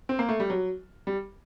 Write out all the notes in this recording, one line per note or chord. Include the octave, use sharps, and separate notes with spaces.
C4
A#3
A3
G3
F#3
G3